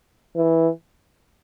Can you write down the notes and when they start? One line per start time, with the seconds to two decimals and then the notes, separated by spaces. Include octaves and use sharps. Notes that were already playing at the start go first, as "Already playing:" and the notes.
0.36 E3